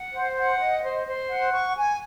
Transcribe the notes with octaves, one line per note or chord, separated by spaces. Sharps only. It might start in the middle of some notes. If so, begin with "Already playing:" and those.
Already playing: F#5
C5
F#5
D#5
C5
C5
F#5
C#6
G#5